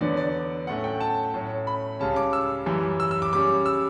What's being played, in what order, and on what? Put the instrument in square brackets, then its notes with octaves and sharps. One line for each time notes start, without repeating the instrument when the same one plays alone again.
[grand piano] E2 D3 F#3 B3 D5
D5
A2 F#3 A3 C#4 F#5
G5
A5
A2 F#3 C#4
B5
C#2 C#3 G3 C#4 A5
D6
E6
F#2 E3 G3
E6
E6
D6
C#3 G3 C#4 D6
E6